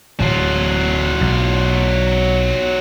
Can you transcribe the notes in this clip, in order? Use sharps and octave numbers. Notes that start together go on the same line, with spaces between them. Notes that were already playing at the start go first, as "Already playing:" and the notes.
D1 F#3 F4
B1